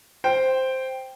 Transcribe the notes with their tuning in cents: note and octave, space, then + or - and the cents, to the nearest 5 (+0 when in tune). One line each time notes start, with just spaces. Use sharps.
C5 +0 G5 +0